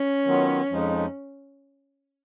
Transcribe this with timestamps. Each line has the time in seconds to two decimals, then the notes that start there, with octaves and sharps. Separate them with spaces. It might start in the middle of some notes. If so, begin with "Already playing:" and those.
Already playing: C#4
0.25 D#3 F#3 B3 F4
0.70 F2 F3 G#3 D#4